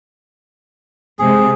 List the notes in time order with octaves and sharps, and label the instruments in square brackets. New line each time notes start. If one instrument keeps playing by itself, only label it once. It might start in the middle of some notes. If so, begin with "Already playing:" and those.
[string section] C3 G#3 [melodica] G#4